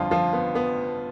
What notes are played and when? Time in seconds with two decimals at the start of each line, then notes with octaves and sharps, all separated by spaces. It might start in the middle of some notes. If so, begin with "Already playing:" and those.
Already playing: G1 F2 D3 F3 F4
0.11 F3 F4
0.33 B3
0.55 B3